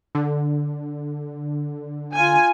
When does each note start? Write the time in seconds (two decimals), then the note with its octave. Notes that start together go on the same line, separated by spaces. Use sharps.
0.15 D3
2.15 F4 G#5